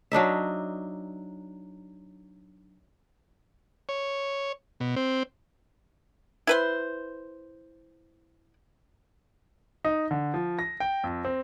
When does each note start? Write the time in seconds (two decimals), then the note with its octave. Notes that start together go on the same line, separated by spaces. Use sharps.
0.12 F#3 D4 D#4 E5
3.89 C#5
4.80 B2
4.96 C4
6.47 E4 B4 C5
9.85 D#4
10.11 D3
10.34 F3
10.59 A#6
10.80 G5
11.04 F2
11.25 C4